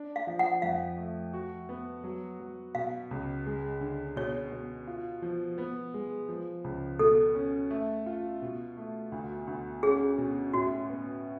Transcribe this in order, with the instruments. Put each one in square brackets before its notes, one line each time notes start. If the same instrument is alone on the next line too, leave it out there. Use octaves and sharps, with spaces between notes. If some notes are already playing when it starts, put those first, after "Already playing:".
Already playing: [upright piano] D4
[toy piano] F5
[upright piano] F3
[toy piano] F#5
[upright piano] F2 [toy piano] F5
[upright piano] A3
F#4
B3
F#3
F#3
[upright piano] B2 [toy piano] F5
[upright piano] C#2
G#3
D3
[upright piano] B2 [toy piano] C#5
[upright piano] B2
F4
F3
B3
G#3
F3
C#2
[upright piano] B2 [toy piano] A4
[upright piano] C#4
A3
F4
B2
A3
D2
D2
[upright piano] C#4 [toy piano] G#4
[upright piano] B2
[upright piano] A2 [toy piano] F#4
[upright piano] B3